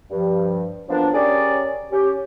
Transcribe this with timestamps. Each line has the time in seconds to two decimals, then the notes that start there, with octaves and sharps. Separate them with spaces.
0.10 G2 F3
0.88 F3 F#3 A#3 B3 D4
1.14 C#4 G4 G#4 A#4 C#5 D5
1.91 C#4 G4